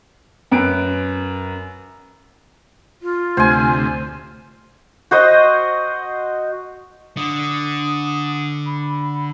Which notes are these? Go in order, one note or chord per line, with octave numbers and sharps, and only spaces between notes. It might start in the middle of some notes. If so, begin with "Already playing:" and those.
F#2 B4 D7
F4
D2 C3 A3 C5 G#5
F#4 C5 D#5
D3 D#6
B5